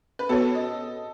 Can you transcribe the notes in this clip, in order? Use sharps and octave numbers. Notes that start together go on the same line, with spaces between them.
B4
B3 F#4 A4 C#5
D#5